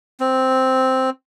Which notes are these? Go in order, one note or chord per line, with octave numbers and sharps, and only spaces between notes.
C4